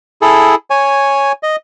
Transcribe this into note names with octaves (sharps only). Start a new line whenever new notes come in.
E4 G#4 A4
C#5 G#5
D#5